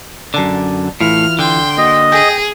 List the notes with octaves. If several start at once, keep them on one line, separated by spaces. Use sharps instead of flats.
F#2 D3 D5 A5
A2 E3 E4 F4 F6
D3 G5 C6
A#3 F#4 D#5
G#4 G5 G#5 A#6